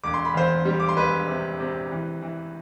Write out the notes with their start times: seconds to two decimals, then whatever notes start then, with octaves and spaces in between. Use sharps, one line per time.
0.04 E1 D6
0.14 C6
0.25 B5
0.34 E2 C5 C6
0.65 G3
0.80 D6
0.89 C6
0.97 E1 B4 B5
1.28 C3
1.60 C3
1.91 E3
2.22 E3